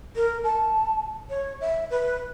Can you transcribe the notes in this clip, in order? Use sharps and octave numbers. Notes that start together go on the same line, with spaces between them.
A#4
A5
C#5
E5
B4